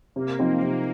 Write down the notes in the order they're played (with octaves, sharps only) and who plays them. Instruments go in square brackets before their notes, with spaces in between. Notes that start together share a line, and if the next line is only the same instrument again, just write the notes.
[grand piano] C3 [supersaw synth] A#3
[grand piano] F3 C4 D#4
[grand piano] C3 [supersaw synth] A#3